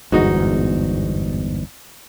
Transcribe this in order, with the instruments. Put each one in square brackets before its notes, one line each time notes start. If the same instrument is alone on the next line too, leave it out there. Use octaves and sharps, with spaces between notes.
[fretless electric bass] G1 E2 G#2 [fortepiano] D#4 F#4